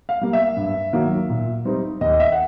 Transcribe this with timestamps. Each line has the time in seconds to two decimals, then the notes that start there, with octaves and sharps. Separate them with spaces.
0.09 F5
0.21 G3 A#3
0.33 E5
0.57 G2
0.93 D#3 F#3 A#3
1.29 A#2
1.65 G3 C4 D#4
2.01 D#2 D#5
2.13 D#5
2.20 E5
2.32 F#5